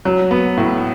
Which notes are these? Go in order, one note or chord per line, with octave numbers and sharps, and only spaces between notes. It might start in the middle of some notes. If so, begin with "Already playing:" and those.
F#3
B3
A2